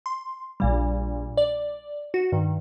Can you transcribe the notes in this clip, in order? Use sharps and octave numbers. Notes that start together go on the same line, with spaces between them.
C6
A#1 A#2 G3
D5
F#4
G2 D#3